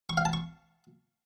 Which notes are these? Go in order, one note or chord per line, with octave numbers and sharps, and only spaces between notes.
C#6
F5
A5
C#6